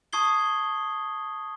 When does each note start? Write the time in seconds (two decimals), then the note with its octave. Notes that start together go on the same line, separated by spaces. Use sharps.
0.13 A5 C#6 D#6 G#6 C7 G7